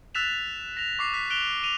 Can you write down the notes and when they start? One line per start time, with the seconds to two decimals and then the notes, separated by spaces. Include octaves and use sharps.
0.15 E6 F#6 A6 B6 E7 F7
0.77 A#6 F7
0.99 C#6 D6 C7
1.14 F#6 B6
1.30 F#6 D7 F7 G7
1.64 D#7 F7